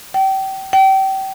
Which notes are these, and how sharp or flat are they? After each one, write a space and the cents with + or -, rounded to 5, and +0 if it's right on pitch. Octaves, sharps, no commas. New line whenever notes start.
G5 -30
G5 -30